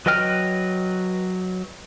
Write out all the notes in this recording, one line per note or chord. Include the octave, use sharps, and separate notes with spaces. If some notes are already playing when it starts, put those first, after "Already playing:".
F#3 B4 D#5 G5 F6